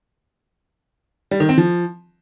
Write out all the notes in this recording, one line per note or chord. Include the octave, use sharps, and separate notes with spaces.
G3
D#3
C4
F3